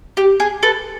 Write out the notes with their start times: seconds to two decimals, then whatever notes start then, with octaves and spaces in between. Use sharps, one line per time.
0.17 G4
0.40 G#4
0.63 A4 B4